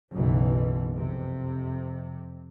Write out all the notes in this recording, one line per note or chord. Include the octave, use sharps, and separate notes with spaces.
F#1 B1 B2 E3
F2 C3